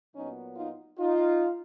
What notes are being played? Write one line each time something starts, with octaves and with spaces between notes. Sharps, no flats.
A#2 F#3 B3 C#4 D#4
D#4 F4
D#4 F4